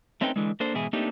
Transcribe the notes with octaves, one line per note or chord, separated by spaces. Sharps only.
A3 C4 C#4 D#4 B4 G5
D3 E3 G#3
A#3 D4 A4 C5
G#2 B2 E3 E4 G#4
A3 A#3 C4 D4 D#4 G4